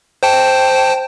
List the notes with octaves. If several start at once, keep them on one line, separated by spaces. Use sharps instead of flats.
C5 G5 A5